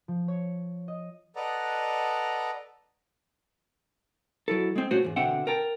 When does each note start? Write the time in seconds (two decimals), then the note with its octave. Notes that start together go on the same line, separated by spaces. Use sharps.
0.08 F3
0.28 C#5
0.88 D#5
1.36 A4 B4 D5 D#5 F#5 A#5
4.48 F#3 E4 A4
4.76 G#3 C4
4.91 A#2 A3 C#4 F#4 C5 C#5
5.03 B1 E2 G#2
5.16 B2 D3 C4 E5 F#5 G5
5.47 A#4 G5 A5